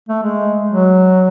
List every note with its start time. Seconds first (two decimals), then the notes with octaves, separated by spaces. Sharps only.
0.09 A3
0.23 G#3
0.69 F#3